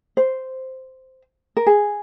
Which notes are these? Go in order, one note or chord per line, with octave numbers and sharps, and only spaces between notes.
C5
A#4
G#4